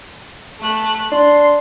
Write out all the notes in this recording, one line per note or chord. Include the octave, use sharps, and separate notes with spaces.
A3 F#6
D4 C6